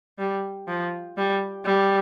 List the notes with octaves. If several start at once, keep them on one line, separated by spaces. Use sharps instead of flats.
G3
F3
G3
G3